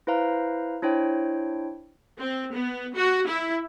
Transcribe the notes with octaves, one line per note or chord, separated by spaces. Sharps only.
E4 B4 C5 F5 A#5
D4 E4 C5 C#5 G5
C4
B3
F#4
E4